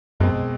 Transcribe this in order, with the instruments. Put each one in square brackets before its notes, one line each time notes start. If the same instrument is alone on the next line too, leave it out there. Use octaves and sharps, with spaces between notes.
[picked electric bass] F#2 [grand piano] B2 G#3 C4